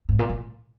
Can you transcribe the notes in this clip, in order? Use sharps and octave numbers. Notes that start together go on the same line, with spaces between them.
G#2
A#2
A#2